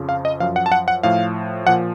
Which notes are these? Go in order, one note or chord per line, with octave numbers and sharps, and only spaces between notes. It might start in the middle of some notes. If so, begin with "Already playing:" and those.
Already playing: F2 C#3 F3
F5
D#5
F#2 F3 F5
F#5
A5
F#5
F#5
A2 F3 F5
A#2 F3 F#5